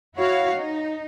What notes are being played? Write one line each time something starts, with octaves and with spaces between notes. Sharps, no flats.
E4 F#4 C#5 F5
D#4